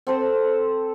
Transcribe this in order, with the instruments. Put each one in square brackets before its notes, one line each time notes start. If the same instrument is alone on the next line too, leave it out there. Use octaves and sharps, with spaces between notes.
[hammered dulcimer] C4 A4 C5